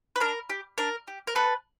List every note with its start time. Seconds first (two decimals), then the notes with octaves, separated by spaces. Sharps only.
0.16 B4
0.20 D4 A#4
0.50 G4
0.78 D4 A#4
1.08 G4
1.27 A#4
1.35 B3 A4 B4